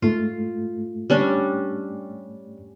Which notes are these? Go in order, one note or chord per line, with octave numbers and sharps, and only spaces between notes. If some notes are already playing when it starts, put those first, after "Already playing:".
G#2 A3 F4
G3 C#4 D4